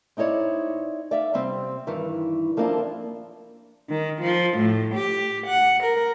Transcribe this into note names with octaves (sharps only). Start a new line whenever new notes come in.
C4 D#4 E4 C#5 D5
D5 E5 F5
C3 G3 C4
G2 D#3 E3
F3 A#3 C4 D4 E4 F4
D#3
F3
A2
G4
F#5
A#4